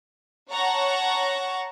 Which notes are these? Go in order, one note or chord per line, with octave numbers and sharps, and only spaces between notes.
C#5 F#5 A5 A#5 C#6